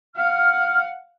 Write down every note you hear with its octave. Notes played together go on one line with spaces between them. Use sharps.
F5 F#5 F6